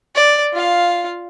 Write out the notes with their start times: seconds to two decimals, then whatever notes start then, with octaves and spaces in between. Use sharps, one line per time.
0.15 D5
0.53 F4 F5